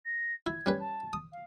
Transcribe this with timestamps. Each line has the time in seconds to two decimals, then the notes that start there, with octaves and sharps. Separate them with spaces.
0.05 A#6
0.46 E4 G#6
0.66 G3 C#4 B4
0.79 A5
1.13 D#6
1.32 F5